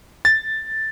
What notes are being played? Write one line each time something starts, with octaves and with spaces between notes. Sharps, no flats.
A6